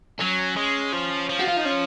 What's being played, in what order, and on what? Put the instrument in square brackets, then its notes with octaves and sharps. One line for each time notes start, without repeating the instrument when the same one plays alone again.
[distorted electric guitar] F#3 [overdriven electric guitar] C#4
[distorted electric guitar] G#3
F3
F3
[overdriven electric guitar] F#4
F4
D#4
C#4